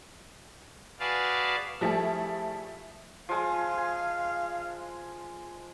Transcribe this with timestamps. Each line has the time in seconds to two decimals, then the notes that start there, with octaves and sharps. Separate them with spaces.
1.00 F#4 G#4 B4 D5 F5 A5
1.81 F3 G3 A3 E4 G#4 A4
3.29 F3 G#3 F5
3.77 G#5